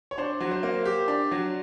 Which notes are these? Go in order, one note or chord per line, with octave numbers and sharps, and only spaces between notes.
C#5
D4 C5
F#3
C5
A#3
G4
D4
F#3